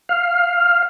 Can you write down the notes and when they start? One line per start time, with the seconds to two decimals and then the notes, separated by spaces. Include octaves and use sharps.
0.09 F5